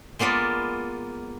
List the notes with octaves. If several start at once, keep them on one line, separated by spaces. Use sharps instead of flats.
G#3 A#3 B3 F4 D5